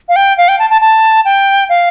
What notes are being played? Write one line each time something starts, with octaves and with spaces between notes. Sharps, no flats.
F5
G5
F5
G5
A5
A5
A5
G5
F5